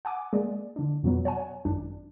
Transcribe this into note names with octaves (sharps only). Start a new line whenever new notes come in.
F#5 G#5 D6
G#3 A#3 D5
D3 D4
F2 B2 F3 F#3 B3
C#5 F#5 G#5
G#1 F#2 D4